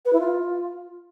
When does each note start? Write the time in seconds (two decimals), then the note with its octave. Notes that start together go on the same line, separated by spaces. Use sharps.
0.05 B4
0.13 E4
0.21 F4